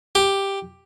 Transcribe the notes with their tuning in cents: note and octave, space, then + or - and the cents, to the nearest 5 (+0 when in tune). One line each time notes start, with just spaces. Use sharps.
G4 +5